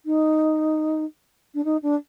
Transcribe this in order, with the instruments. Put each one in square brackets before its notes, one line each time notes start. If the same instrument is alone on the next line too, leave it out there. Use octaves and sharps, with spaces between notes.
[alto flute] D#4
D4
D#4
D4